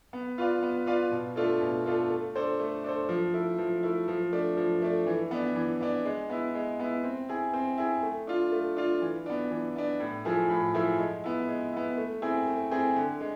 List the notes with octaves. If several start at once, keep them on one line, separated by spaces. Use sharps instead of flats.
B3
F4 B4 D5 F5
B3
F4 B4 D5 F5
B2
A3 D4 F4 A4
B2
A3 D4 F4 A4
A3
D4 A4 C5
A3
D4 A4 C5
F3
A3 E4
F3
A3 E4
F3
A3 D4
F3
A3 D4
E3
B3 D4
E3
B3 D4
G#3
B3 E4
G#3
B3 E4
C4
E4 G#4
C4
E4 G#4
A3
D4 F4
A3
D4 F4
E3
B3 D4
E3
B3 D4
A2
F3 A3 E4 G#4
A2
F3 A3 E4 G#4
G#3
B3 E4
G#3
B3 E4
A3
C4 E4 G#4
A3
C4 E4 G#4
D3
G#3